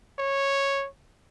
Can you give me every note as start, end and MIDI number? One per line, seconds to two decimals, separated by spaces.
0.19 0.87 73